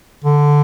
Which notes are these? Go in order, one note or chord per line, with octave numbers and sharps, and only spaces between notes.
D3